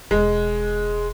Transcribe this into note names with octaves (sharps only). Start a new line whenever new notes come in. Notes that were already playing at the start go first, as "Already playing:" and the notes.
E1 G#3